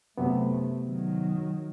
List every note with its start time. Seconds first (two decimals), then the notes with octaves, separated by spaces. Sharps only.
0.17 F#2 C3 A3 B3
0.85 D#3 F#3